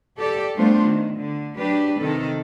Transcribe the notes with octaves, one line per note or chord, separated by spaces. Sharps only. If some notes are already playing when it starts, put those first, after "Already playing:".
G4 A4 D5
G3 A3 B3 D4 F4 C5
D#3
D3
F#3 D4 G4 B4
C3 D#3 A4